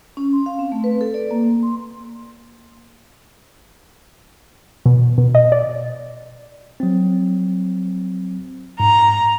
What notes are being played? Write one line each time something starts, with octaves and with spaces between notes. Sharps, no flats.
C#4
C6
F5
C4
A3
B4
A4
D5
A#3
A#3
C6
B2
B2
D#5
D5
F#3 C4
G#2 A#5